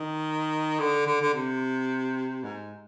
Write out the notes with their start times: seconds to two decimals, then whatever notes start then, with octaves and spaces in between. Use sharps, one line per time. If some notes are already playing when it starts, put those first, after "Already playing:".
Already playing: D#3
0.79 D3
1.06 D3
1.21 D3
1.34 C3
2.43 G#2